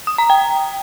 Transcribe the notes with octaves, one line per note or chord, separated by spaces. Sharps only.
D#6
A#5
G5